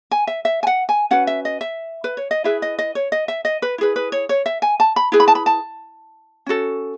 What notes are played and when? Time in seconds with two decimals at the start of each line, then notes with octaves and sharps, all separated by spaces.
0.11 G#5
0.27 E5
0.45 E5
0.63 G#5
0.67 F#5
0.89 G#5
1.11 C#4 F#4 B4 F#5
1.27 E5
1.45 D#5
1.61 E5
2.04 B4
2.17 C#5
2.31 D#5
2.44 E4 G#4 B4 E5
2.62 D#5
2.79 D#5
2.95 C#5
3.12 D#5
3.28 E5
3.45 D#5
3.62 B4
3.78 E4 G#4 B4
3.96 B4
4.12 C#5
4.29 C#5
4.46 E5
4.62 G#5
4.80 A5
4.96 B5
5.12 E4 G#4 B4
5.20 B5
5.28 A5
5.35 B5
5.46 A5
6.46 C#4 F#4 A4